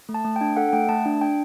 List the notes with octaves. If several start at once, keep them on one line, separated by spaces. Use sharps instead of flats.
A3
A5
A3
D4 G5
A4 F#5
F#5
A3 G5
A3 A5
D4
D4 G5